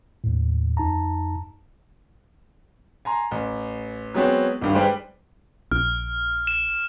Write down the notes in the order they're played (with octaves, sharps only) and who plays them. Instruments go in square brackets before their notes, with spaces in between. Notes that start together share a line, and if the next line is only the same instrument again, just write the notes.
[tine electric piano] D#2 A2
F2 D#4 A5 A#5
[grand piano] G#5 A#5 C6
A1
F#3 G#3 B3 C4 C#5
G#1 G2 D#3
G3 G#3 B4 C5 G5
[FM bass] A#1 [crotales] F6
[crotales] E7